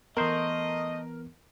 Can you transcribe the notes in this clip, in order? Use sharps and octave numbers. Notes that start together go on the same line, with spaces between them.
E3 A3 B3 A#4 C5 D#5